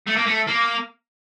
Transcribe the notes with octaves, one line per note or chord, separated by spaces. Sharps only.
A3
A#3
A3
A#3